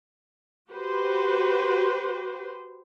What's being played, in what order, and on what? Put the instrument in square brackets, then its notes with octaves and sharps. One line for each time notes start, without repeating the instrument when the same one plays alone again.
[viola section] F#4 G4 B4 C5